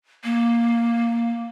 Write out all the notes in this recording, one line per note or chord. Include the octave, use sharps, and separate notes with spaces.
A#3